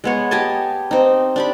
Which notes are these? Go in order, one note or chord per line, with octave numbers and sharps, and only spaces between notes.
G#3 B3 C#5
G4 D#5 G#5 A5
C4 D#4
D4 G4 B5